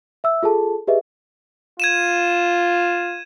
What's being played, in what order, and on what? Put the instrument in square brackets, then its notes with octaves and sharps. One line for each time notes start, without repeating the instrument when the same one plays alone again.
[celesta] E5 E6
F4 G#4 A4 A5
G4 G#4 B4 D#5 E5
[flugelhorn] F4 [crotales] G#6 D#7 E7